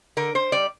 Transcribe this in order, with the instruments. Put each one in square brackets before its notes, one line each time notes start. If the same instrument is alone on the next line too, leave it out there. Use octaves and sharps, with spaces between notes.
[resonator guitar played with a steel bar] D3 A#4
C5
G3 D5